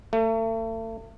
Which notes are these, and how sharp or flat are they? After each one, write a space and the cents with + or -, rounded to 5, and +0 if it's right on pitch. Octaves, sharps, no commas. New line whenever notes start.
A3 +40